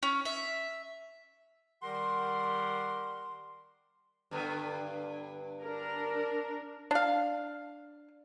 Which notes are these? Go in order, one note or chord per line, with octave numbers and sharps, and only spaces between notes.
C#4
E5
D#3 G3 G4 A#4 F#5 C6
G2 D3 B3
D4 A#4
D4 F5